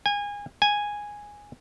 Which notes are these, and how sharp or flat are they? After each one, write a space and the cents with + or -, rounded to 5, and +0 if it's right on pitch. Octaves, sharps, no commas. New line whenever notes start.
G#5 -25
G#5 -5